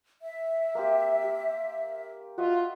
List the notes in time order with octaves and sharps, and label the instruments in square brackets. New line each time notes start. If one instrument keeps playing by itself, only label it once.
[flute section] E5
[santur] A#3 C4 G4
G4
[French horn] F4 [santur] F#4 D#5 E5